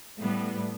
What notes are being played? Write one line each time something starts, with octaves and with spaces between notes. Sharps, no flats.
A2 G3 B3